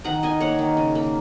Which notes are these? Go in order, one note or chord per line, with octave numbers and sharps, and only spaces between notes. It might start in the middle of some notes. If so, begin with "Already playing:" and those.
D#3 F#5 A#5
D#4 D#5 G#5
A#3 C#5 F#5
D#3
C#3
A#3